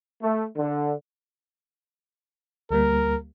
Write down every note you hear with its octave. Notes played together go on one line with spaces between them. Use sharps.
A3
D3
D2 G3 A#3 A#4